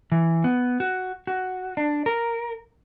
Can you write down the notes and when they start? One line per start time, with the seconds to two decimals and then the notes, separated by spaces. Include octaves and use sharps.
0.12 E3
0.44 B3
0.80 F#4
1.27 F#4
1.77 D4
2.06 A#4